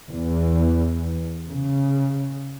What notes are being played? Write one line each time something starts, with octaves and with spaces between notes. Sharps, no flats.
E2
C#3